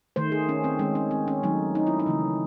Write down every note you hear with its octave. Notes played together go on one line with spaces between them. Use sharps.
D#3 A3 C5
G#4
C#4
C4
D#3 G#3 C#4
C#4
C4
C#4
D#3 F#3 A3 D#4
D#4
E4
D#4
C#3 E3 A3